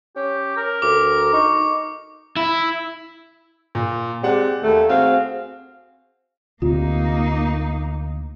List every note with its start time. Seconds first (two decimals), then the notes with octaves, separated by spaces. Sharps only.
0.16 C#4 G4
0.57 A#4
0.82 D2 D6
1.33 D#4 C#6
2.36 E4
3.75 A#2
4.23 G#3 C4 G4 D5 F#5
4.63 D#2 A3
4.89 C4 F#4 G#4 F5
6.62 D2 C3 A#3 D#4 F4